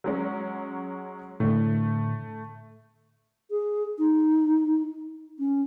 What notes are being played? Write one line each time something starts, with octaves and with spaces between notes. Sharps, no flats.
F#3 G#3 C#4
A2 D3 A3
G#4
D#4
C#4